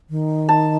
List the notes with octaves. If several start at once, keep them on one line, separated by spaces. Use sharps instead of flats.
D#3
A5